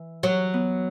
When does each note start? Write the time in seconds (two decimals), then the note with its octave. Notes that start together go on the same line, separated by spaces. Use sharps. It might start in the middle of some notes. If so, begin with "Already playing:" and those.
Already playing: E3
0.23 F#3
0.54 B3